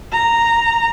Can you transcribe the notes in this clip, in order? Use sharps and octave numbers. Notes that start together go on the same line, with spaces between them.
A#5